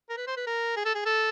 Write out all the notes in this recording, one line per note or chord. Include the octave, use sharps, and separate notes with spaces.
A#4
B4
C5
B4
A#4
G#4
A4
G#4
A4